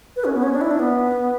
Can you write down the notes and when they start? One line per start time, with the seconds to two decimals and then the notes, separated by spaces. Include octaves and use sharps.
0.16 B4
0.25 C#4
0.34 B3
0.43 C#4
0.53 D4
0.61 E4
0.71 D4
0.79 B3